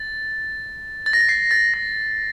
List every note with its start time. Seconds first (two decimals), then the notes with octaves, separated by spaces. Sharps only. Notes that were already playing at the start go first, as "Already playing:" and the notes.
Already playing: A6
1.06 A6
1.13 A#6
1.21 A6
1.29 C7
1.51 A6
1.74 A#6